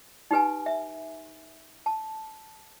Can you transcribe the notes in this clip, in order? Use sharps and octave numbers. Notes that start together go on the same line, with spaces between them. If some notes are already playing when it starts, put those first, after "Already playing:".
D#4 G4 B4 G#5
E5
A5